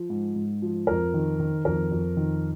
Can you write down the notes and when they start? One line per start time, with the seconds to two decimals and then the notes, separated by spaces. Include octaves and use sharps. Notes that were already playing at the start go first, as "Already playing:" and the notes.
Already playing: F3
0.10 G#2
0.36 G#2
0.62 F3
0.87 F2 A#4
1.14 D#3
1.40 D#3
1.65 F2 A#4
1.91 F2
2.17 D#3